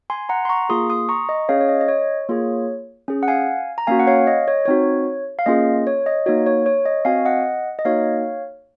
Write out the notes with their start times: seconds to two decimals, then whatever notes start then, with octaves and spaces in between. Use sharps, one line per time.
0.10 G#5 C6
0.29 F#5 A#5
0.45 C6
0.49 A#5 C#6
0.69 A#3 F4 G#4 C6 D#6
0.90 C6 D#6
1.09 A#5 C#6
1.29 D#5
1.49 C#4 G#4 C#5 F5
1.61 C#5
1.69 D#5
1.81 D#5
1.88 C#5
2.29 A#3 F4 G#4
3.08 C#4 G#4
3.23 F#5
3.28 F5 G#5
3.78 A#5
3.87 A#3 C#4 F#4 F5 G#5
3.99 F#5
4.07 C#5 F5
4.27 D#5
4.48 C#5
4.66 C4 D#4 F#4 C#5
5.39 F5
5.46 A#3 C#4 F4 G#4 D#5
5.87 C#5
6.06 D#5
6.26 A#3 D#4 F#4 C#5
6.46 C#5
6.66 C#5
6.85 D#5
7.05 C4 F#4 F5 G#5
7.25 D#5 F#5
7.79 D#5
7.85 A#3 D#4 F#4 C#5 F5